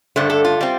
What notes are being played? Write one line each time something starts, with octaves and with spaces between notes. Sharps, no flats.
G2 D3 A3 C5
A4
F4
G3 C4